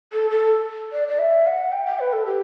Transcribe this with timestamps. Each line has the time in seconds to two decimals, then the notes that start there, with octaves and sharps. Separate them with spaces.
0.13 A4
0.30 A4
0.92 D5
1.08 D5
1.19 E5
1.46 F#5
1.72 G5
1.86 G5
1.99 B4
2.13 A4
2.26 G4